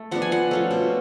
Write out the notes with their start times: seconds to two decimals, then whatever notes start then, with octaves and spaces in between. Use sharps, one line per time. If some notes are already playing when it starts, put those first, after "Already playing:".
Already playing: A3
0.11 F3 B3 D4 F#5
0.22 G#5
0.32 F3 F#5
0.51 A3 C#4 F4
0.71 B2